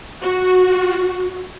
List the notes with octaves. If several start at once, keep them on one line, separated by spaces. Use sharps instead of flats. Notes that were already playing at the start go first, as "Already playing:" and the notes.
F#4